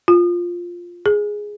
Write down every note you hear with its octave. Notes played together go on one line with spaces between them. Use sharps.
F4
G#4